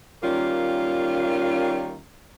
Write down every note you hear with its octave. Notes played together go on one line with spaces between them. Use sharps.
D#3 G3 A#3 C#4 F4